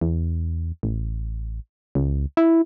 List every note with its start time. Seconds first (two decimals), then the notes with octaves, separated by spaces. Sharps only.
0.01 E2
0.83 A1
1.95 C#2
2.37 E4